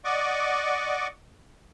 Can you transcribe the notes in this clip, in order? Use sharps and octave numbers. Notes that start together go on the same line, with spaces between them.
D5 D#5 F#5 C#6 D6